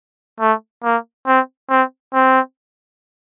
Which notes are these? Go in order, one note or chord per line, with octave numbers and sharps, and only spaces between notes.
A3
A#3
C4
C4
C4